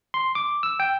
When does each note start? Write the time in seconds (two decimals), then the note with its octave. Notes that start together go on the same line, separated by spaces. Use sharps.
0.14 C6
0.35 D6
0.63 E6
0.80 G5